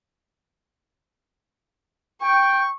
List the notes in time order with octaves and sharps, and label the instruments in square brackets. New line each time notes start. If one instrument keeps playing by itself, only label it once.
[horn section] G5 [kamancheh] C#6